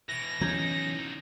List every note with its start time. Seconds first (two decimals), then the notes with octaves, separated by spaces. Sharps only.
0.09 B2 E3 A#6
0.41 D3 E3 F#3 B3 C#4 D#4 G6 G#6